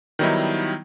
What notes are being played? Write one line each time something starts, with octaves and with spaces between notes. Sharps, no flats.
D#3 F#3 G3 B3 D#4 E4